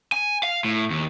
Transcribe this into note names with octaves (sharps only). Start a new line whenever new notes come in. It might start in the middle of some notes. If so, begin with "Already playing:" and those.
G#5
F5
A2
D#2